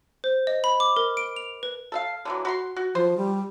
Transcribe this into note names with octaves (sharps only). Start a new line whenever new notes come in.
C5
D#5
B5
D6
A#4
D7
F7
B4
A4 E5 F5
D3 E3 F#3
F#4 B5 C6
F#4
F3 C5
G3